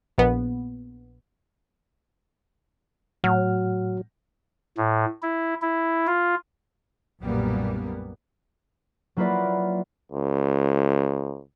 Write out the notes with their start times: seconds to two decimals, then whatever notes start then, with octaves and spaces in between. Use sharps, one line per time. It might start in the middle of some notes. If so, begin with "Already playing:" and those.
0.18 A#1 B3
3.24 A2 F#3 F#5 F6
4.77 A2
5.23 E4
5.62 E4
6.07 F4
7.21 B1 F#2 A#2 G3 A#3 B3
9.17 F#3 A#3 E4 F4 B4 D5
10.12 C#2